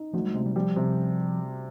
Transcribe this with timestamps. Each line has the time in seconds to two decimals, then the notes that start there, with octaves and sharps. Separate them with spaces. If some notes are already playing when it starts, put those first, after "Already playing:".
Already playing: D#4
0.13 D2 F3
0.24 G3
0.34 C3 G#3
0.46 G3
0.56 F3 G3
0.76 C3